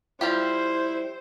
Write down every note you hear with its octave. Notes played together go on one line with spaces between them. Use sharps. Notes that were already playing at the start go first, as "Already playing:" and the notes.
F3 G3 E4 G4 C5